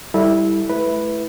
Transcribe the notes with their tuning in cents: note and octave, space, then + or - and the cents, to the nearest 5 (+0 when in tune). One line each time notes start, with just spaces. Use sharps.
G3 +0 E4 -10 A4 +0
A3 -35 E4 +0 B4 +0